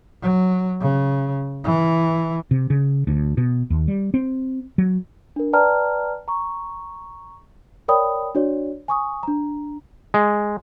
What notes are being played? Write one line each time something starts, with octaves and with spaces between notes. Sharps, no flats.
F#3
C#3
E3
C3
C#3
D2
B2
D#2
G3
C4
F#3
D4 A#4
B4 D5 G5 A5 A#5 F6
A#5 C#6
A#4 C#5 D5 G5 B5 D#6
D4 F#4 C#5 D5
G#5 C#6 D#6
D4 A#5
G#3